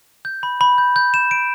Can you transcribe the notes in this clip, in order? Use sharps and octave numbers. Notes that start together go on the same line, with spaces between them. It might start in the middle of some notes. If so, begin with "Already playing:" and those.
G6
B5
B5
G6
G6
E7
D7